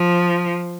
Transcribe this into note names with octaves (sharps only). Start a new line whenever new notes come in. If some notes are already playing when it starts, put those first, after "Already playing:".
Already playing: F3